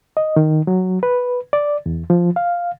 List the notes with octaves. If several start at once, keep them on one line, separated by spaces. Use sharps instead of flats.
D#5
D#3
F#3
B4
D5
E2
F3
F5